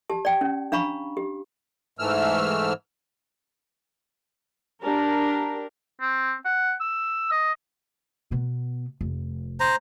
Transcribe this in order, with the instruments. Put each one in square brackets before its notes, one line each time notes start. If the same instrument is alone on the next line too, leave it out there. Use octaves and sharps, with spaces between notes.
[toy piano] G4 A5
D5 G5
C#4
D4 F5 A#5 B5 C#6
G4
[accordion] G#2 E3 A3 E6 F6
[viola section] D4 G4 A#4
[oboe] C4
F#5
E6
D#5
[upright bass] B2 B3
F1
[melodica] C5 A#5